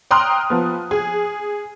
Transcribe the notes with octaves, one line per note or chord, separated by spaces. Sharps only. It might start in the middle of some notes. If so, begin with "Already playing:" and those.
G5 A#5 C6 D#6 F6 F#6
F3 B3
G#4